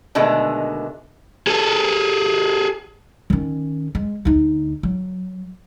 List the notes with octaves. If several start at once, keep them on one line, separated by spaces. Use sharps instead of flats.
B2 D3 D#3 G#3 A3
G#4 A4
D#3 C#4
G#3
D2 D#4
F#3